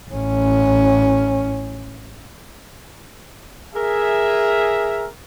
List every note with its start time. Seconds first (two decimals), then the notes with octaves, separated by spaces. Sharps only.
0.11 A1 C#4
3.74 G#4 A#4 E5